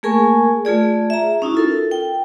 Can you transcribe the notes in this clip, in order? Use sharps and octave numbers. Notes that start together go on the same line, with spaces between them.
A3 A#3 G#4 A#4 G#5 C#6
A3 F4 G#4 D5
E5 A#5
C#4 D#4 E4 F#4
F4 A4 A#4
G5